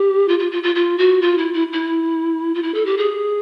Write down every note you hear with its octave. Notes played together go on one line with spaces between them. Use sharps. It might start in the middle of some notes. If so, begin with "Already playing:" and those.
Already playing: G4
F4
F4
F4
F4
F4
F#4
F4
E4
E4
E4
F4
E4
A4
G4
G#4